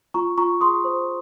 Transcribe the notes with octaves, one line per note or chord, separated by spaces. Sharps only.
F4 A#5 C#6
F4 A#5 C#6
G#4 C6 D#6
C5